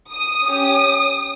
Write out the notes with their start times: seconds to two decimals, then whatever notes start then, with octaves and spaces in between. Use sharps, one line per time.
0.11 D#6
0.45 C#4 G4 D#6